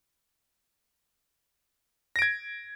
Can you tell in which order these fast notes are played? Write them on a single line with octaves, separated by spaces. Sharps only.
A#6 D7 G#6